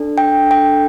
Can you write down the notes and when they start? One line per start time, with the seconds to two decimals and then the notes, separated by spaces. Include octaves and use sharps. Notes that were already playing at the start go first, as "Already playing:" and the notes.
Already playing: D4 A4
0.18 G5
0.51 G5